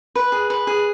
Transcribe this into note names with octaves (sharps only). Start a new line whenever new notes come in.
B4
G#4
B4
G#4